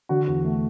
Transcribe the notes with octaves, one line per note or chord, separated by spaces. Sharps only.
D3 F#4
E2
A3